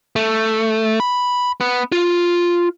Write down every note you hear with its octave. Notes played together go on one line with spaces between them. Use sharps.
A3
B5
B3
F4